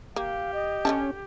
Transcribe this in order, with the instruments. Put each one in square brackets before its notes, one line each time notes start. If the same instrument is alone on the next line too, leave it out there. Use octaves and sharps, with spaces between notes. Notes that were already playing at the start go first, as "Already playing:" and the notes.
[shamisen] A#3 [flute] G4 [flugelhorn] F5
[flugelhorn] D#5
[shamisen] D3 D#3 A5 [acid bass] C#4